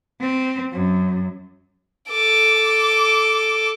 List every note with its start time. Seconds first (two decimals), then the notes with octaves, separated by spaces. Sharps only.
0.21 C4
0.73 F#2
2.10 A4 D6